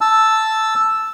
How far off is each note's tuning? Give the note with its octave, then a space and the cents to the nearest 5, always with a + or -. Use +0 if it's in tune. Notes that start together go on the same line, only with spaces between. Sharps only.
A5 +0 E6 +0